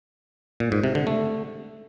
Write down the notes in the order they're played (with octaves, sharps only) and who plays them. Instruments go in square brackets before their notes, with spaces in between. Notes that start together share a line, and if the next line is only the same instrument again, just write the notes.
[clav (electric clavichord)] A#2
G#2
C3
D3
A3